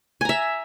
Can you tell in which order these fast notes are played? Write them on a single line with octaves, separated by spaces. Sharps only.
G#5 A#5 E5